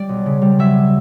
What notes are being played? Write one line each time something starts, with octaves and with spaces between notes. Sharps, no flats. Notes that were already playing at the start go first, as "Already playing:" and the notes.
Already playing: G3 D5
B1
C#3
G3
F#3 E5